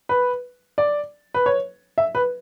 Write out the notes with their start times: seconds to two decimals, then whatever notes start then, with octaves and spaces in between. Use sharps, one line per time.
0.09 B4
0.78 D5
1.34 B4
1.46 C#5
1.98 E5
2.15 B4